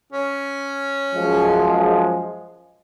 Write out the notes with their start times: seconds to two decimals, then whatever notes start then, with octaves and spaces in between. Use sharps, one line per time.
0.12 C#4
1.15 F#2 F3 G#3